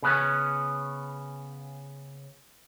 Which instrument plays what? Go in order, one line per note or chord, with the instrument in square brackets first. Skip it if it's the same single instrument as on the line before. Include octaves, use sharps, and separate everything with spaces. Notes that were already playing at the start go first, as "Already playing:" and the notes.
[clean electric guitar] C#3 B3 C#4